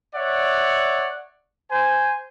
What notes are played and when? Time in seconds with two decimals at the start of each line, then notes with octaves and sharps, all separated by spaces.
0.14 C#5 D5 E5 F#5
1.70 C5 G#5